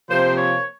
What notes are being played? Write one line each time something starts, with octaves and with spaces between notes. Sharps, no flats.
C3 F3 A#3 C5
C#5